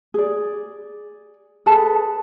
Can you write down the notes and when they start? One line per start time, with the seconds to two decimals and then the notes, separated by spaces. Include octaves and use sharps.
0.14 G#4 D5
1.66 G#4 A4 B4 A5